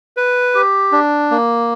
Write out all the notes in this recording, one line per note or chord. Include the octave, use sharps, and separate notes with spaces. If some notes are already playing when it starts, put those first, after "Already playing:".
B4
G4
D4
A#3